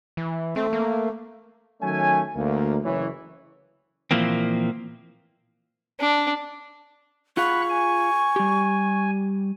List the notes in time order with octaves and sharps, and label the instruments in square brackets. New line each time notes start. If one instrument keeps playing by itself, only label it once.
[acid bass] E3
[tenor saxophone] A3 [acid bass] C4
[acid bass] A#3
[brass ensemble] D#3 F#3 A3 C#4 G#5
D2 A#3
F#1 E3 C#5
[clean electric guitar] A#2 E3 F3 A#3 C4
[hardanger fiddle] D4
[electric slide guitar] F4 G#4 F5 [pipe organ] F#5 B5 F#6 [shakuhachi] C#6
[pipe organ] G#5
[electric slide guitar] G3 G4